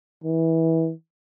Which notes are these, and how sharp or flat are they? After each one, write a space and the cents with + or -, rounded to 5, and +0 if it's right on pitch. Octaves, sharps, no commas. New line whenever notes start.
E3 -20